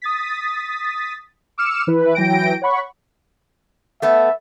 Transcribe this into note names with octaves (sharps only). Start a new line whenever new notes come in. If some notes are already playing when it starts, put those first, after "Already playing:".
D#6 A6 B6
D6 E6 F6 C#7 E7
E3 E4 B4
E3 F#3 G5 A#6 D7
C#5 F#5 B5 C#6
A3 B3 E5